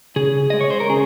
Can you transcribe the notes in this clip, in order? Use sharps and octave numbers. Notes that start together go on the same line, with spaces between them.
C#3 G#4
G#3 D#5
C#5
C5
A#4
C#3 G#4